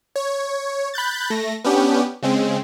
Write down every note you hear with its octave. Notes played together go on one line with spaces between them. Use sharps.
C#5
B5 F#6 G6 A6
A3 A#6
B3 C#4 D4 G4
C#3 G#3 C4